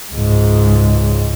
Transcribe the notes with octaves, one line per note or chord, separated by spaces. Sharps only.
C#2 G#2